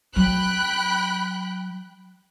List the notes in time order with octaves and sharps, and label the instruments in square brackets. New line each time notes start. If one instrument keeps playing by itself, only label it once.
[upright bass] F#3 [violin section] G5 B5 F#6